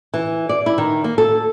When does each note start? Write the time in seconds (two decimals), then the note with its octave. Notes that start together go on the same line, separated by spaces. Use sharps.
0.14 E3
0.49 D5
0.66 E4
0.78 D#3
1.04 A#3
1.18 A4